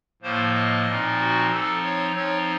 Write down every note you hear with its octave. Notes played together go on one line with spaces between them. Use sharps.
A2 F3 A#3 C5
D#5
A#2 F3 C4 D#4
F#4
F3 C4 D#4 A4
C#5
F3 C4 D#4 C#5